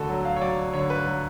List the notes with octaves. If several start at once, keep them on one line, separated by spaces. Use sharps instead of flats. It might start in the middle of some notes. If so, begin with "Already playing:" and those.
Already playing: D2 D3 F#4 A4
F#3
F5
C#5
F#3 D5
D3 C#5
B4
F#3